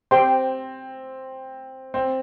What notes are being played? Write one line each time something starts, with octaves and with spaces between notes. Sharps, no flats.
C4 G4 C5 G5 C6
C4